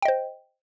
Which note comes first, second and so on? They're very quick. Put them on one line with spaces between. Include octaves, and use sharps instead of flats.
G5 D#5 C5